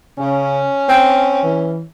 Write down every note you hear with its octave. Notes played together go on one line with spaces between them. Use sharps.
C#3 C#4
C4
E3